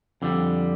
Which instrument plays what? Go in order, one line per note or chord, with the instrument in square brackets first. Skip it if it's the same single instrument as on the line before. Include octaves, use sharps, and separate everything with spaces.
[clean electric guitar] F2 D3 G3